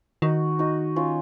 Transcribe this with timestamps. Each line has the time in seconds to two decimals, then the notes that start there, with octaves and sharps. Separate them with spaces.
0.22 D#3 D#4 F#4
0.59 D#4 F#4
0.96 C#4 F4